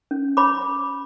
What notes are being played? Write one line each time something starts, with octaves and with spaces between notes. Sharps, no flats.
C#4
C#5 B5 D6